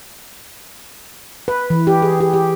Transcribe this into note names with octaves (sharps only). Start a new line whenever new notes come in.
B4
E3
G4
G#4
G4
G4